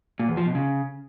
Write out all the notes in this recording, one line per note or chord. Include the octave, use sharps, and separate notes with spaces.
A#2
E2
F3
B2
C#3